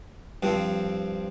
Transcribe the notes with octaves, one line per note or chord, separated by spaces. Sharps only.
G2 F3 C4